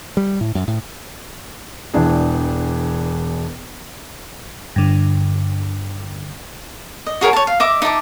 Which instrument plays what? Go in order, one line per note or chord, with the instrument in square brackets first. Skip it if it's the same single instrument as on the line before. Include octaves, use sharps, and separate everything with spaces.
[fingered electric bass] G3
A2
F#2
A2
[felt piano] E1 E3 D4 G#4
[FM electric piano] G2 D3
[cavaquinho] D#5
F#4 G#4 A#4 C#5
C#5 A5
F5
D#5 E5 D6
D#4 E5 A5 D6